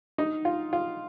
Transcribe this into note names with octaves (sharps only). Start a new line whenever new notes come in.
D#4
F4
F4